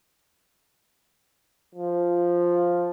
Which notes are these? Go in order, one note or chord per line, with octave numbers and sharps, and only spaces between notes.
F3